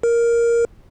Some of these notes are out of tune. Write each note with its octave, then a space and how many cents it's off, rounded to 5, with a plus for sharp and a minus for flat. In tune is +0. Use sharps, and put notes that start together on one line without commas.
A#4 +5